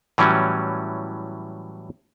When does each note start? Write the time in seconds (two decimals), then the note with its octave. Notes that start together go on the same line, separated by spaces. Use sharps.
0.18 A2 E3 F#3 G3 C#4